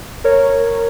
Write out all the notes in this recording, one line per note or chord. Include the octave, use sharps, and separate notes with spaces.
A#4 C#5